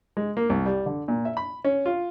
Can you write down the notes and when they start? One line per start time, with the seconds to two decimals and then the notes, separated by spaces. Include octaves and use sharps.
0.17 G#3
0.37 A#3
0.50 C2
0.66 G3
0.86 D3
1.08 A#2
1.25 E5
1.37 B5
1.65 C#4
1.86 F4